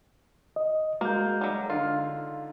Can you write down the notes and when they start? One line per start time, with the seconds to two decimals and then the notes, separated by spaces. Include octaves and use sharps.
0.56 D#5
1.01 G#3 A#3 F#4 G6
1.41 F#3 G3
1.70 D3 D#4 F4 F5